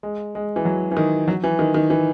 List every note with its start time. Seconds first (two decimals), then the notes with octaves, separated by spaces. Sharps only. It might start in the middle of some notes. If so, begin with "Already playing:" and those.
0.03 G#3
0.35 G#3
0.56 E3
0.65 F#3
0.91 E3
0.97 D#3
1.28 F#3
1.44 E3
1.59 D#3
1.74 D#3
1.90 E3